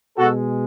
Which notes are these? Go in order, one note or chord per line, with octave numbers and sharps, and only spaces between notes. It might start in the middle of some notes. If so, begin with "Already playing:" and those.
B2 G#3 F#4 A4